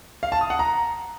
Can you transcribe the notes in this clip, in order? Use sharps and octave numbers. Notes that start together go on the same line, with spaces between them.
F5
A5
D#6
F#5
A#5